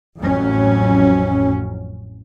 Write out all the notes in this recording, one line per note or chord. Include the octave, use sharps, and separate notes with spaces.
A1 F2 A2 F#3 C#4